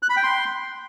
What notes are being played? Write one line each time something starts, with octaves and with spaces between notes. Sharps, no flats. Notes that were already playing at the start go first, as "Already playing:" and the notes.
F#6
B5
G5
C6